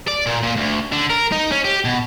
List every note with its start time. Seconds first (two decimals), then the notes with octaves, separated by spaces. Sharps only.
0.08 D5
0.26 A#2
0.43 A#2
0.57 D2
0.92 D3
1.10 A#4
1.32 D#4
1.52 C#4
1.65 G4
1.85 B2